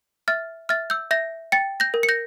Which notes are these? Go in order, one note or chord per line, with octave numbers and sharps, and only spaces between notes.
E5 F6 A6
E5 F6 A6
E6 G6
E5 G6 A#6
G5 A6 C#7
G6 A#6
A#4
C#7
G6 A#6